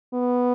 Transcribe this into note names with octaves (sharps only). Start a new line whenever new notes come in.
B3